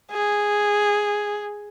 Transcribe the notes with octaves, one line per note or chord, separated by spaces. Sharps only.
G#4